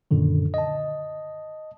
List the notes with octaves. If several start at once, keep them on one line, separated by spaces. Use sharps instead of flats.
F#2 A#2 D3 D#3
D#5 A5